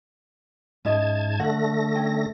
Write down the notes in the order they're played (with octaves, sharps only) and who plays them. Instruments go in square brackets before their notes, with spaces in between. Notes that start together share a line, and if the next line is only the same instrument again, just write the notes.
[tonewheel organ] G#2 A5 G#6 [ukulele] C#4 E4 D#5
[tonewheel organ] D3 A3 A#6 [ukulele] F#5
[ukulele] C#4 G5